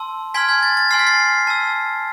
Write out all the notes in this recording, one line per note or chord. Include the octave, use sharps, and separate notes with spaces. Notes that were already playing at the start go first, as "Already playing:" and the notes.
Already playing: A5 C6 E6
G#5 C6 F6 G#6 B6
G#6
A6
A6
G#5 C6 F6 C7
B6
A6 C7
A5 E6